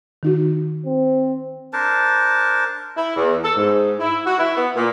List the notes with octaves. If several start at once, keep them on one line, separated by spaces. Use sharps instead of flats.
D#3 D#4 F#4
C4
D4 A#4 C5 A5
E4
E2
A4
G#2
E4
F#4
E4
B3
A#2